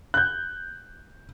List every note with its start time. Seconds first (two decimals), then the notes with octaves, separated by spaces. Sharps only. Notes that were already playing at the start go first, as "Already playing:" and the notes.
0.14 F#6 G6